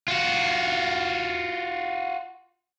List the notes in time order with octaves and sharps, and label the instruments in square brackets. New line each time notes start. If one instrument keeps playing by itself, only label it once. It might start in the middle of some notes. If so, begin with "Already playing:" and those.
[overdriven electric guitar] F4 F#4